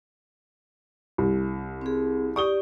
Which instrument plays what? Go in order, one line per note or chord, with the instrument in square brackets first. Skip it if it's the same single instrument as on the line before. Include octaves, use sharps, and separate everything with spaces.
[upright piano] C2
[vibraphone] C4 G#4
[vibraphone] G4 D5 [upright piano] C#6 D#6 G7